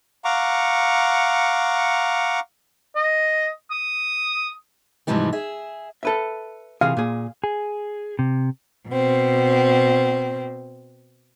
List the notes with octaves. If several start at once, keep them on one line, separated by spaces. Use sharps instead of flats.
F5 F#5 A#5 C#6 D6
D#5
D#6
G#2 C3 E3 F3 G3 C4
G#4 E5
A4 B4 E5
C3 E3 G#4 F5
A#2 G#4
G#4
C3
B2 C4